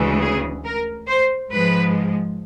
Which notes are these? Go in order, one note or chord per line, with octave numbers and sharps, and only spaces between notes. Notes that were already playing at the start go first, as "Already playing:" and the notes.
Already playing: D2 C#3 E3 G#3
G#4
A#4
C5
G#2 F3 G#3 B4